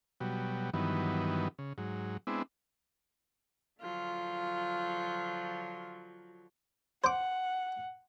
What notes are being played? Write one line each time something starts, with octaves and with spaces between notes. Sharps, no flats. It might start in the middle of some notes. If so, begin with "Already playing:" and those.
B2 F#3 G3
G2 D#3 E3 F#3 B3
C#3
G#2 F#3
G#3 B3 C4 D4 E4
D3 F3 F#3 F4
C5 F#5 D6